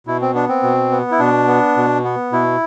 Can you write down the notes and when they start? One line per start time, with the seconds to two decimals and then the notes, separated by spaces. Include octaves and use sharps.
0.07 B2 E4
0.21 C4
0.34 B3 D4
0.49 C4
0.63 B2
0.91 B3
1.12 E4
1.19 B2 D4
1.47 B3
1.77 B2
2.04 B3
2.32 B2 E4